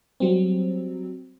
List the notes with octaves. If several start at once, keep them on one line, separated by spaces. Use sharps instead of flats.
F#3 G3 C4